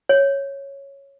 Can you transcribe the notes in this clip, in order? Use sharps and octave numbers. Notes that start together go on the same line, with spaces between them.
C#5